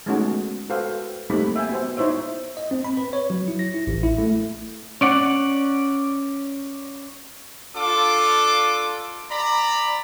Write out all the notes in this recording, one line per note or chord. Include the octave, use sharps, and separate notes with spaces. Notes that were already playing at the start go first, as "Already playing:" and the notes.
G#3 A3 B3 C#4 D#4 F#4
F#4 A4 B4 C5 F5 G5
G3 A3 A#3 C4 D#4 B5
E5 G5 G#5
B3 F#4 C5
D#4 E4 C5 C#5 E5
D#5
C4
B5
B4
C#5
F#3
E4
A#6
E4
A1
E4
A3
C#4 D5 F#5
D4 F4 A4 D6
D5 A#5 B5